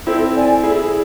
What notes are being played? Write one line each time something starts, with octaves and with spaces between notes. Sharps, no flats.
C4 E4 A4
D5 G#5
E4 G#4 A4